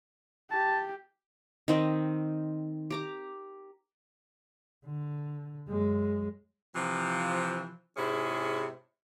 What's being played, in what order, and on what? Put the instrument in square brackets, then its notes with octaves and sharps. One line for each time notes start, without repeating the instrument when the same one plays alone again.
[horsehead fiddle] G4 [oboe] A5
[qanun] D#3 C4 D#5
G4 A#5 D6
[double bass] D3
F#2 G#3
[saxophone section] C3 E3 F3
G#2 C3 C#4 E4 G#4